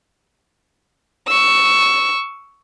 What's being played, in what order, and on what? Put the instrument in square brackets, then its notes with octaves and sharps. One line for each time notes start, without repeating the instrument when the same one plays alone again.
[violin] C#6 E6